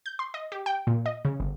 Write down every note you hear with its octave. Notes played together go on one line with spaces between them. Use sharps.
G6
C6
D#5
G4
G5
A#2
D#5
C#3
G1